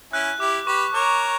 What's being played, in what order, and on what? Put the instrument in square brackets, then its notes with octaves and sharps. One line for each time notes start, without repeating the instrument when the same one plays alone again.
[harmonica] C#4 E4 [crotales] F#6
[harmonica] E4 G4 [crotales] D6
[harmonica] G4 B4 [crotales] C#6
[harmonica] A#4 C#5 [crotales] D6